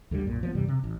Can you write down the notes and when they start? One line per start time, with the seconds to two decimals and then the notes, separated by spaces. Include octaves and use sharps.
0.11 D2 D3 D#3 G3
0.24 B1 F#2 A#2
0.43 F3 F#3 B3
0.55 G2 C3 E3 G3
0.68 C3
0.84 A1